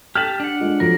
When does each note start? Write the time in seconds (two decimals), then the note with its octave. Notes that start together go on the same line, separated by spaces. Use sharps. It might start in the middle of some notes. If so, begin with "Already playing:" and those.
0.15 G4 A5 F6 B6 F#7
0.40 D4 F#5
0.60 G#3 F4
0.80 F2 F3 F#3 D4 A#4